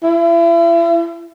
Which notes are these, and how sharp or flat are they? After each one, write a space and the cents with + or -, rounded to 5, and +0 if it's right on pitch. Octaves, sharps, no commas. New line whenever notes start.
E4 +35